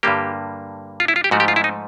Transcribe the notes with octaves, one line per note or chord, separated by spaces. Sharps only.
G2 D3 G3 A#3 G4
F4
E4
F4
G4
G#2 F3 A3 F#4
G4
F4
E4
D#4